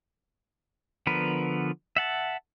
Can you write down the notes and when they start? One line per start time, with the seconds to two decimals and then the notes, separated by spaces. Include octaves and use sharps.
1.07 D3 F3 B3 A#4 B4
1.97 E5 F#5 A5